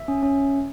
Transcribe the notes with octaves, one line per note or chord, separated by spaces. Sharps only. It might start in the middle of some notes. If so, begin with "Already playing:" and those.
Already playing: E5
C#4
C#4